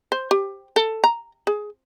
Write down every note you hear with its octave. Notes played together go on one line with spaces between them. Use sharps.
C5
G4
A4
A#5
G#4